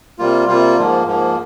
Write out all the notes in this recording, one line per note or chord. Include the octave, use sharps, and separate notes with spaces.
C3 G3 A#3 F4
C3 G3 A#3 F4
G#2 F3 A#3
G#2 F3 A#3